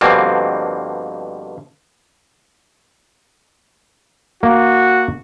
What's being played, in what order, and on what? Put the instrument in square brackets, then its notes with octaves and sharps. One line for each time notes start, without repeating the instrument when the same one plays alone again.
[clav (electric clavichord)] G2 B2 D3 F3 A#3 C4
[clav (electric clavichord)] A#3 [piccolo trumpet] F#4